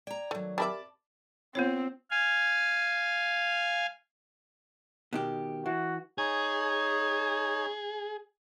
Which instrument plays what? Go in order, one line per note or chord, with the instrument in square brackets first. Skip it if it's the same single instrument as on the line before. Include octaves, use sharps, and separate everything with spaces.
[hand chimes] D5 [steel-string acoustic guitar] G5 A#5
[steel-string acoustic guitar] D#3 F#3 [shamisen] A3
[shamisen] G4 A#4 E5 [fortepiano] A5 B5 D6
[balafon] B3 F4 C#5 [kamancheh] C4
[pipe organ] F5 G#5
[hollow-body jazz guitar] B2 D#3 G4
[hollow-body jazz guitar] E3 [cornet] F#4
[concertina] D#4 C#5 [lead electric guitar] G#4